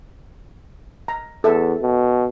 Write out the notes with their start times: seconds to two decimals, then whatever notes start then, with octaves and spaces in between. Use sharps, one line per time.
1.08 A#5
1.44 E2 A4 E5
1.81 B2